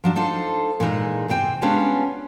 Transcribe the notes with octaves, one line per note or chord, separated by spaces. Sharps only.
F3 F#3 D4
D4 D#4 F4 A4 C5
A#2 E3 G#3 D#4 G#4
E2 C3 C4 G5 G#5
G3 G#3 B3 C#4 D4 F4